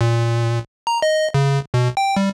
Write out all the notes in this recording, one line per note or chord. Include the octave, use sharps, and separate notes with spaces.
A#2
A#5
D#5
C#3
B2
G5
G3